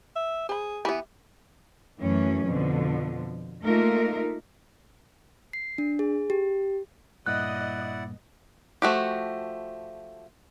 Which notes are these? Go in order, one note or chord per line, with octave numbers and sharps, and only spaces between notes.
E5
G#4 C5 B5
E3 B3 G4 E5 B5
F#2 E3 F#3 A3 C#4
F2 B2 D3 F3
A3 A#3 D#4 F4 A#4 E5
C7
D4
G#4
G4
G2 A#2 E4 D5 D#5 F#5 F#6
F3 A3 F#4 G4